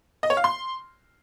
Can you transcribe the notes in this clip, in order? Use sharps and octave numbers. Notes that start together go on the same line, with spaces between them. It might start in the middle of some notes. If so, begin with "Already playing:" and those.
D#5
C#5
F5
C6